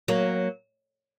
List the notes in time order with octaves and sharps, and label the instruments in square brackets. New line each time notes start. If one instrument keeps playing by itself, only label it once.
[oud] F#3 A#3